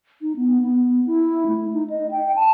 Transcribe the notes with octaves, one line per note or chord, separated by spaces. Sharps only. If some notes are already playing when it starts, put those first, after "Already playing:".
D#4
B3
B3
E4
A3
D#4
D#5
G5
A5